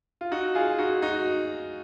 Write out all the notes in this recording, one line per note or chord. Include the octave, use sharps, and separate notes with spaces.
F4
D#4 F#4
F4 G#4
D#4 F#4
D#4 F#4